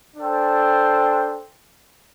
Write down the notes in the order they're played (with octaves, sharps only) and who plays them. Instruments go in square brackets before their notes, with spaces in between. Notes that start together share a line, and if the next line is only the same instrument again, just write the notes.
[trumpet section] D4 A4 C5 G5